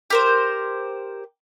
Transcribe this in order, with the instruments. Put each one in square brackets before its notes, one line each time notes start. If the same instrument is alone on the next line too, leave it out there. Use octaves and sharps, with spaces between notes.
[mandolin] G4 A#4 C5